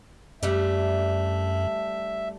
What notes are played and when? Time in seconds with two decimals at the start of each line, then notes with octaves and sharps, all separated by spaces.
0.43 F#2 G3 A3 D4 E5